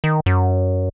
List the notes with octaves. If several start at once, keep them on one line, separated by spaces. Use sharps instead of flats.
D#3
F#2